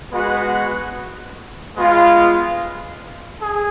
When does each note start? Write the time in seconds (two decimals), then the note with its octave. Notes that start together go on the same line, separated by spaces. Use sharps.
0.11 G#3 B3 F#4 B4 F#5
1.75 G#3 B3 F4
3.39 G#4